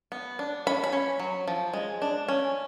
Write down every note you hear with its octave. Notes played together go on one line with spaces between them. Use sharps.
B3
D4
C#4 B5
B5
C#4
F#3
F3
G#3
D4
C#4